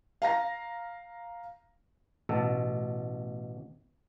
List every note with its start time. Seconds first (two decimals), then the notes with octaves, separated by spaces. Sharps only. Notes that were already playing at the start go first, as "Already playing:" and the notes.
0.22 F5 A#5 A#6
2.29 A1 B2 A4